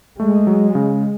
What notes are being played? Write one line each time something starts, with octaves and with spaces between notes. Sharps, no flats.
G#3 A3
F#3
C#3